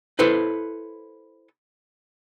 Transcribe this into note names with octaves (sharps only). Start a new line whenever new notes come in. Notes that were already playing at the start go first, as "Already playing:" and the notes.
E4 A4 B4 C5